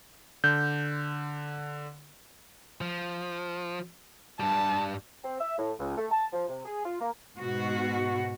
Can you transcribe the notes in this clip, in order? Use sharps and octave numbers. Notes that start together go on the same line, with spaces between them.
D3 G6
F3
G2 G3 A5
C4
E5
A2
C#2
A3
A5
F3
C3
G#4
F4
A#3
G#2 B2 F#4